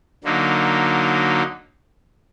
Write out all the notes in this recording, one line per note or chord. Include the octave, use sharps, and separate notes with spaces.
D3 F#3 A#3 D#4